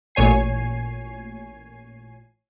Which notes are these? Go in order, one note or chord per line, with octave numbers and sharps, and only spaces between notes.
A1 A#2 C#5 G#5 C7